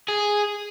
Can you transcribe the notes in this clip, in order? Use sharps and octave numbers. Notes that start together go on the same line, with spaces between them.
G#4